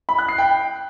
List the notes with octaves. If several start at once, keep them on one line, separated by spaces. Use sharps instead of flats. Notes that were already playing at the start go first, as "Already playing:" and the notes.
B5
F#6
C7
G5